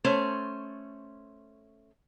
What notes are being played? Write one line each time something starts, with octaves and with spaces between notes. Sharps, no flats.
A3 C#4 C5